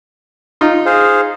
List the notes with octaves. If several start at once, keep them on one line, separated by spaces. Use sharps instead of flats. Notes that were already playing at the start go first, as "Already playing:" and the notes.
D#4 F4
G#4 C5 F5